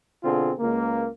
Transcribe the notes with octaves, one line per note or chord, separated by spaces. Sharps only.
B2 D3 C4 F4 G#4
C#2 A#3